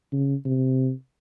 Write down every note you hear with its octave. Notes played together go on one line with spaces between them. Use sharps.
C#3
C3